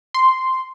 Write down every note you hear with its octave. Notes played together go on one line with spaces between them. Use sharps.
C6